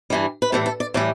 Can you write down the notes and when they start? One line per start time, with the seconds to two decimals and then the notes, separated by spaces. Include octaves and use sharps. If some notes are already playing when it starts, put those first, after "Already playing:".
0.10 G2 E3 G3
0.42 B4
0.52 A2 E3 G3 A4
0.66 A4
0.80 D5
0.94 A2 E3 G3 D5